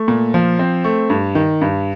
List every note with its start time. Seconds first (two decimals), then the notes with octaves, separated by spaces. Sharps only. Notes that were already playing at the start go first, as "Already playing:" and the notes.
Already playing: A3
0.08 A#2
0.34 F3
0.59 C4
0.84 A3
1.10 G2
1.35 D#3
1.61 G2